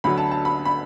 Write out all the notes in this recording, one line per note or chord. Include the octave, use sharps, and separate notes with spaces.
D2 D3 F#3 B5
A5
A5
B5
B5